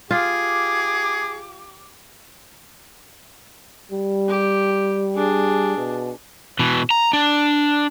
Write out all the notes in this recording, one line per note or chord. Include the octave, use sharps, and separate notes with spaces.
F4 G4 G#4 D6
G3
G4
D4 G#4
B2
B2 E3
A#5
D4